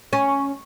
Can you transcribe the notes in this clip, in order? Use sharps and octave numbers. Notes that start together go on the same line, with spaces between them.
C#4